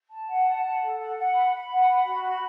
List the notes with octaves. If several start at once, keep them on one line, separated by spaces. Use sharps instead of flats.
A5
F#5
A5
F#5
A4
F#5
F#5
B5
B5
F#5
B5
F#4
B5